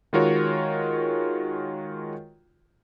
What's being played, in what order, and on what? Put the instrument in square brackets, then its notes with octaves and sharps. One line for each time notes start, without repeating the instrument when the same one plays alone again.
[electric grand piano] D#3 G#3 F4 F#4 A#4 C#5